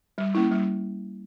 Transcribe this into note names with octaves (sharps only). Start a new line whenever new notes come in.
G3
A#3 C#4 E4
G3